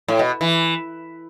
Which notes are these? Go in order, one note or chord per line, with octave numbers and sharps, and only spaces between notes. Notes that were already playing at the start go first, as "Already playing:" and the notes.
A2
B2
E3